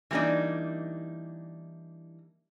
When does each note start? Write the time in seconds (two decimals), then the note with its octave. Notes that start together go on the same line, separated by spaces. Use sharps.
0.11 E3 G3 A#3 D4 D#4